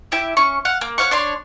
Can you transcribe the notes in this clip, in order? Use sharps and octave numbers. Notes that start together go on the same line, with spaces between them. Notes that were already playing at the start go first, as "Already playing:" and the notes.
E4 G4 E5
C#4 C#6
F5 F#5
A#3
C#5 F5 F#5 C#6
D4 C#5 C6